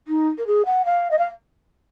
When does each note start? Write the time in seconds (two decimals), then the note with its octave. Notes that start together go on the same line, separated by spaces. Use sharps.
0.07 D#4
0.38 A#4
0.46 G#4
0.65 F#5
0.85 F5
1.11 D#5
1.18 F5